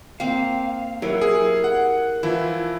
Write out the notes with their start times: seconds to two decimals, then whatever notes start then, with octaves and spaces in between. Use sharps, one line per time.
0.20 A#3 C4 F5
1.02 F#3 E4 G4 A#4
1.21 G#4
1.64 F#5
2.23 E3 F3 E4